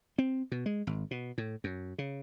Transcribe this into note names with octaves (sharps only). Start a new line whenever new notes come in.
C4
B2
G#3
G#1
B2
A2
F#2
C#3